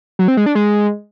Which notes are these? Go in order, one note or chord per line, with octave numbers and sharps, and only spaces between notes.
F#3
C4
G#3
D4
G#3